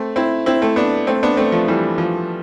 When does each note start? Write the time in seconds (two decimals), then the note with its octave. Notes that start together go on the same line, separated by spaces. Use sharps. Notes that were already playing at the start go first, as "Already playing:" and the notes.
Already playing: A3 C4
0.16 C4 E4
0.46 C4 E4
0.62 A3 C4
0.76 B3 D4
1.07 A3 C4
1.23 B3 D4
1.37 A3 C4
1.52 F3 A3
1.68 E3 G3
1.98 F3